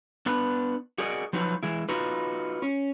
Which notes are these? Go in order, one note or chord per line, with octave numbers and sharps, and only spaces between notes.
B3 D4 B4
F#4 G#4 A#4 D5 D#5 F#5
F3 F#3 D#4 F#4 B4
E3 G#3 E4
D#4 F4 F#4 B4
C#4